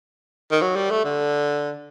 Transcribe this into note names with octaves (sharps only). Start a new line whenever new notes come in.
D#3
F#3
G3
A3
D3